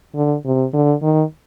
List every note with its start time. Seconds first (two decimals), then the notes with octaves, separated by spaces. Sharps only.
0.15 D3
0.45 C3
0.73 D3
1.02 D#3